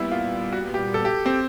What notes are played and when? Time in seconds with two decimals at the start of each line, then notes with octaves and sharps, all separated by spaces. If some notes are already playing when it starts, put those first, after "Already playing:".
Already playing: A#2 G3 B3 E4
0.12 F4
0.53 F#4
0.74 G4
0.94 A4
1.05 G4
1.26 C4